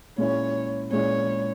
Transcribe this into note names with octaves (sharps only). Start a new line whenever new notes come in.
A#2 G#3 C#4 E4 C#5
A#2 G#3 C#4 E4 C#5